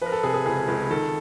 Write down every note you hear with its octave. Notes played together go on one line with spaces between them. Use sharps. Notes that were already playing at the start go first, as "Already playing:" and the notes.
F3 A#4 B4
A4
C3 G#4
G#4
C#2 G#4
C#2
D#3 A4